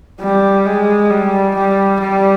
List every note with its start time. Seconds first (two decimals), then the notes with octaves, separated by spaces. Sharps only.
0.20 G3
0.66 G#3
1.10 G3
1.55 G3
2.00 G3